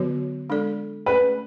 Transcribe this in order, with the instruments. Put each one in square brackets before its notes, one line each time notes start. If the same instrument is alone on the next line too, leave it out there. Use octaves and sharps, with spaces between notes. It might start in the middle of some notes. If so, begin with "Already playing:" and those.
Already playing: [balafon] D3 F#3 B3 F#4 C#5
G#3 D4 A4 D5
[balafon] A3 C#4 G#4 D5 [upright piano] B4